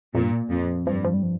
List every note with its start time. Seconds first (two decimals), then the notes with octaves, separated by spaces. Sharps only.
0.15 F2 A#2
0.23 G2
0.32 A#2
0.50 F2
0.87 G2 F3
0.96 G3
1.04 F3
1.14 G3
1.23 F3